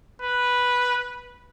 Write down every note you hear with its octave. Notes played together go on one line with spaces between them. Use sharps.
B4